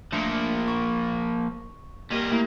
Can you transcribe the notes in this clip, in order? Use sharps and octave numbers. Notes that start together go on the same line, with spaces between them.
F3 A3 A#3 D4 C#7
C#6
G3 A#3 G4 A#4 D#5
A3 A#3 E4